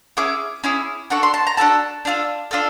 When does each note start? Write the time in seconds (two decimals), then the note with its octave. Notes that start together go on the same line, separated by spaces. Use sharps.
0.17 C#4 E4 G#4 D6
0.64 C#4 E4 G#4
1.10 D4 F#4 A4 C#6
1.23 C6
1.34 A5
1.47 A#5
1.57 D4 F#4 A4 A5
2.05 D4 F4 A4
2.51 D4 F4 A4